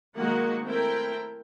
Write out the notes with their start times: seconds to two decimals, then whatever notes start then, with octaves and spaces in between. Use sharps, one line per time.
0.17 D#3 F#3 G#3 A#3 F#4 F#5
0.63 A3 C4 E4 A#4 G5